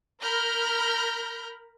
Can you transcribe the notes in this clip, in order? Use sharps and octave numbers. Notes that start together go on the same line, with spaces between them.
A#4 A#5 B5 F6 G6 A#6